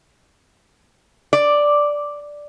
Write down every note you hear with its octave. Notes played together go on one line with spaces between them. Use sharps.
D5